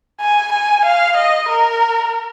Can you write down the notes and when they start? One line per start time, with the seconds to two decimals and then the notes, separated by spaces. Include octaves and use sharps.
0.20 G#5
0.52 G#5
0.85 F5
1.17 D#5
1.50 A#4